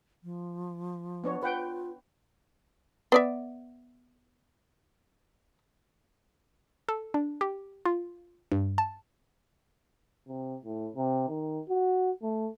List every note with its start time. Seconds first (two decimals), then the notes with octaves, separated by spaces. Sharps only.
0.24 F3
1.24 B3 D4 C#5
1.43 F4 B4 F#5 G5
3.12 B3 D5 E5
6.89 A4
7.14 D4
7.41 G4
7.85 F4
8.52 G2
8.78 A5
10.28 C3
10.64 A2
10.96 C3
11.28 D#3
11.69 F#4
12.23 A3